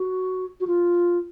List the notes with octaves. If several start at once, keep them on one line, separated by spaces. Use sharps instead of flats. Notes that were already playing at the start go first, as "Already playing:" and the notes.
Already playing: F#4
F#4
F4